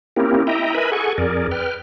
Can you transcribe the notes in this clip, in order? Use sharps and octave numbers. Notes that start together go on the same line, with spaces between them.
A#3 C4 C#4 E4 G4 A#4
E4 D#5 E5 G5 A#5
A#4 B4 D#5 E5 G#5 B5
G#4 A4 F#5 G#5 C#6
F2 G#4 A#4 D5
B4 G5 F6